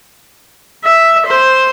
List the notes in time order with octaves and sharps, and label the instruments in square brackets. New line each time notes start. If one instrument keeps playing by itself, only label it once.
[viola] E5
C5